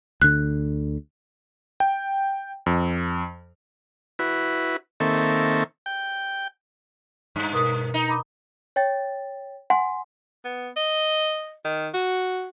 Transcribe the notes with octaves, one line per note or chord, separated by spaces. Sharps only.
D2 D3 F#6
G5
F2
E4 F#4 B4
D#3 A#3 C4 A4 E5 C#6
G5
G2
B2 A#4 D#6
D#4
A#5 B5 D6
C#5 G5 A6
F#5 G#5 C6
B3
D#5
D#3
F#4